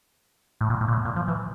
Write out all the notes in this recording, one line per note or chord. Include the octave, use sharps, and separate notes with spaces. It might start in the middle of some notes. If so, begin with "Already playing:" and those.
A2
A#2
A2
A#2
A2
A#2
F3
E3